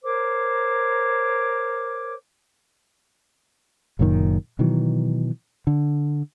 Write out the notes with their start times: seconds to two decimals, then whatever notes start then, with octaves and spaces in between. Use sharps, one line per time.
0.03 A#4 C5 C#5 D6
3.99 F#1 F#2 A#2 D#3
4.59 B2 D#3 E3 F#3
5.67 D3